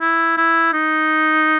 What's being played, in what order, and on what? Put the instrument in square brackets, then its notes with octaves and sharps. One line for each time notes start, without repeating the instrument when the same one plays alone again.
[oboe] E4
E4
D#4